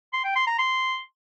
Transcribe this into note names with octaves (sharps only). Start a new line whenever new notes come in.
C6
G5
C6
A#5
C6